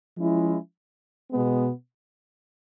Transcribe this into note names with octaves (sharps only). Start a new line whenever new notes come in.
F3 G#3 C#4 E4
B2 G#3 B3